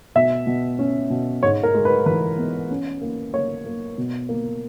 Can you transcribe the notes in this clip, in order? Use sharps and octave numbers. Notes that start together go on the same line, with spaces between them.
B2 E5
B2
C#4
B2
G#2 C#5
A#4
G#3
B4
E3 B4
B3
C#4
A#3
A#3 C#5
A#3
B2
A#3